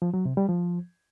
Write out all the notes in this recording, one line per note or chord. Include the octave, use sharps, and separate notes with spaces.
F3
F#3
C3
G3
F3